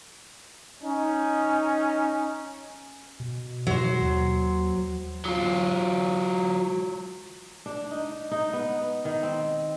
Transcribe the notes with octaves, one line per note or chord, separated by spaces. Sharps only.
C#4 D#4
B2
F#3 C5
D#2
F#3 F4
D4
D#4
D#4
B3
D#3
C4